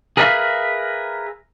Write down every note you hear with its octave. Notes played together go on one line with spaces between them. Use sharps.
G#4 A#4 B4 D5 E5 F5